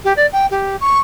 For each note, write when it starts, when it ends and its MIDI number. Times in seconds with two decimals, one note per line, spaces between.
0.04 0.13 67
0.16 0.26 74
0.32 0.46 79
0.51 0.76 67
0.80 1.00 85